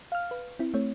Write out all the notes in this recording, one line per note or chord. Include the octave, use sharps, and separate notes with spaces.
F5 F6
B4
C4 E4
A3 C4 C#5